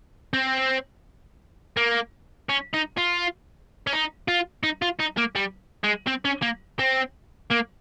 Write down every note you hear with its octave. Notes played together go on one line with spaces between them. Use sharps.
C4
A#3
C#4
D#4
F4
C#4
D#4
F4
D#4
F4
D#4
A#3
G3
G#3
C4
C#4
A#3
C4
A#3